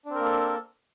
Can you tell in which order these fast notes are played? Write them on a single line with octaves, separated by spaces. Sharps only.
D4 C4 A#4 A#3 A4